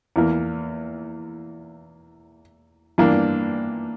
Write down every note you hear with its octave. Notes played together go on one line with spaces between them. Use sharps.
E2 E3 A#3
G2 E3 A#3 D4